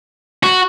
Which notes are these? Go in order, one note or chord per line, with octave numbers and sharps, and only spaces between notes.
F#4